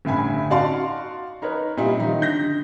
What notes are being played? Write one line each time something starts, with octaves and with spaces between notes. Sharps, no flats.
G1 A2 E5 G#5 B5
D#4 F#4 D5 F5 A5 C6
D#4 A#4 B4 C#5
A#2 G3 D#4 E4
D#3 F3 D#4
D3 G6 A#6